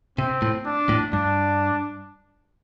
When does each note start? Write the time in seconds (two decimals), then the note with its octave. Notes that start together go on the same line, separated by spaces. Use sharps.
0.18 C3 C4
0.42 A2
0.66 D4
0.89 A2
1.13 G2 D4